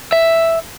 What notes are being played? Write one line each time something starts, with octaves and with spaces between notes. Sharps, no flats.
E5